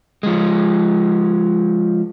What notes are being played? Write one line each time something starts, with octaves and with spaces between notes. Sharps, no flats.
F3 G#3